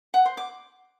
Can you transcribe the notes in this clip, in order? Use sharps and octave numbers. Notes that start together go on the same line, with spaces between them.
F#5
C5
D6